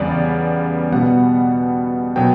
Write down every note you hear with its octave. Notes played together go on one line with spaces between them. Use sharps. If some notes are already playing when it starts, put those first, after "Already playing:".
Already playing: E2 C#3 G3 B3 D5
B2 G3 B3 F#5
B2 F#3 B3 G5